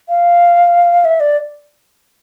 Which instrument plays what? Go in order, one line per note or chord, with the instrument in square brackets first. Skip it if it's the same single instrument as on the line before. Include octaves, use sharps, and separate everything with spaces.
[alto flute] F5
E5
D5